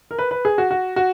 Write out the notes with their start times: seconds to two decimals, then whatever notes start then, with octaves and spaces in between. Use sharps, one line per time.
0.11 A#4
0.19 B4
0.31 B4
0.45 G#4
0.58 F#4
0.71 F#4
0.96 F#4